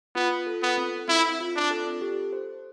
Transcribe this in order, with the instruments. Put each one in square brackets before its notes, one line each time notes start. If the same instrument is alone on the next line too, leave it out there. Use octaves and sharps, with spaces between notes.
[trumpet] B3 [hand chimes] F4
[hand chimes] A4
[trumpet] B3
[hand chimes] C4
[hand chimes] C4 [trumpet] E4
[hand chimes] F4
[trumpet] D4
[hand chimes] A4
G4
C5